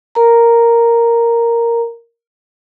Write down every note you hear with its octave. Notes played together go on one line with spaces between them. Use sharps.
A#4 A#5